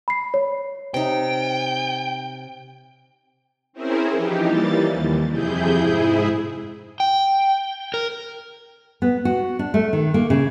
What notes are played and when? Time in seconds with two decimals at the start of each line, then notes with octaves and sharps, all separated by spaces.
0.08 B5 C7
0.34 C#5
0.94 C3 D#4 G5
3.73 C4 C#4 E4 G#4 A#4 C5
4.12 E3 F3 D#4 G4
4.46 E3 G3 A#3 A6
4.89 D#2
5.28 F2 C3 E4 G#4 G6
5.78 G#2 E4 G#4
7.00 G5
7.94 A#4
9.02 B3
9.25 F#4
9.59 D4
9.74 A3
9.93 D#3
10.14 A#3
10.30 C#3